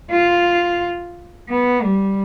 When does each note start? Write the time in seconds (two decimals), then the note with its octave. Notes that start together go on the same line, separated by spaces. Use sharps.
0.11 F4
1.49 B3
1.82 G3